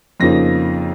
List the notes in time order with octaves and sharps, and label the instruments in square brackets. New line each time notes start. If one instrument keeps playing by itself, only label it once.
[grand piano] F2 C#3 F3 A#3 D#4 A#6